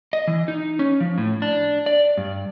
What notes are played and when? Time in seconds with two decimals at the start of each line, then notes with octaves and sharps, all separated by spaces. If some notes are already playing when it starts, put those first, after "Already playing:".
0.13 D#5
0.27 E3
0.48 D#4
0.79 C#4
1.00 F3
1.18 A2
1.42 D4
1.86 D5
2.17 G2